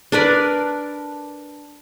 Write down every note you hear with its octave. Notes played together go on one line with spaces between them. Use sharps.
D4 A#4 B4 D5